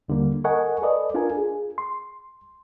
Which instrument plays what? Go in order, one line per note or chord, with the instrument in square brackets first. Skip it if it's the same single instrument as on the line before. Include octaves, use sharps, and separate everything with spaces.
[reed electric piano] D#2 D3 G3 A#3
A4 A#4 D#5 F#5 G#5 C#6
A4 B4 D5 D#5
D4 F4 A4 A#4 G#5
G#4
C6